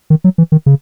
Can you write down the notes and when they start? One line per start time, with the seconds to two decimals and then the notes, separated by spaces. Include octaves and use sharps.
0.10 D#3
0.24 F#3
0.38 E3
0.52 D#3
0.66 C#3